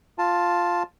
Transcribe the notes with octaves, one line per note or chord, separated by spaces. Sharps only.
F4 A5